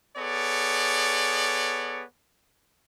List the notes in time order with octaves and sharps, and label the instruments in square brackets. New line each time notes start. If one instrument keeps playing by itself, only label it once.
[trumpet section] B3 G#4 A4 C#5 D5